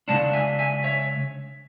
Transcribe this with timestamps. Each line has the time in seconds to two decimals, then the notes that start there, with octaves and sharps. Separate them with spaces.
0.08 C#3 G#3 D4 F#5 A5
0.33 E5 G#5
0.59 E5 G#5
0.84 C#5 E5